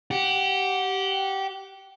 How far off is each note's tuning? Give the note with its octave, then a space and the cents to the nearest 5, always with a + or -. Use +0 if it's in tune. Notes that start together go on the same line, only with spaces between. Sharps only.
G4 -15 F#5 +0